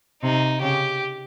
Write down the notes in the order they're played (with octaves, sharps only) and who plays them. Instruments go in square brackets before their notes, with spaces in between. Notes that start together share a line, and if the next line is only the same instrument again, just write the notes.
[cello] C3 [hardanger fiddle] D#4
[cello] C#3 [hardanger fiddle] G4